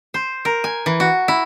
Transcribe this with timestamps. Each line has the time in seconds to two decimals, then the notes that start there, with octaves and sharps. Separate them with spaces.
0.14 C5
0.45 A#4
0.64 G#5
0.86 E3
1.00 F#4
1.28 E4